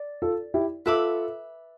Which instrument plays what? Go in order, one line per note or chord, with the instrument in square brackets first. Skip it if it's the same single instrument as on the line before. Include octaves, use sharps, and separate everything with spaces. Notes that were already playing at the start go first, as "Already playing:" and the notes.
Already playing: [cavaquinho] D5
[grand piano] F4 A4
E4 G4
[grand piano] F4 A4 [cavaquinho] B4 E5 B5 D6